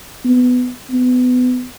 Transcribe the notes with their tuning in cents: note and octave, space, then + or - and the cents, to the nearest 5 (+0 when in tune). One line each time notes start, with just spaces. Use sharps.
B3 +15
B3 +25